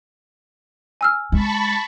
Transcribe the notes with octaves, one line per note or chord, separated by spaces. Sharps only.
G#5 E6 F6
G#3 A5 B5 C#6